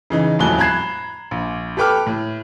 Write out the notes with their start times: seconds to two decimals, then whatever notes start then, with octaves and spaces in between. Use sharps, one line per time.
0.10 C#3 E3 D#4
0.39 D#1 F2 A2 F#4 F#6 G7
0.59 A#5 B5 F#6 G#6 C7 E7
1.31 A#1
1.77 G4 A4 B4 G5 D6 F6
2.06 A2